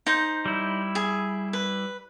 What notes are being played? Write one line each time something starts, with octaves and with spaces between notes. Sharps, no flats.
D#4 C5
G3 E4
G#4
B4